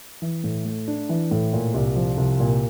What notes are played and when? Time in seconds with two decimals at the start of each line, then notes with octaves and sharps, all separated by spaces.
0.22 E3
0.44 A2
0.65 A3
0.88 D4
1.09 E3
1.31 A2
1.53 A#2
1.74 C2
1.96 F3
2.18 C2
2.40 A#2